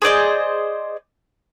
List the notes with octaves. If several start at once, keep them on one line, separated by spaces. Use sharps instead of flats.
G#4 C5 D5 D#5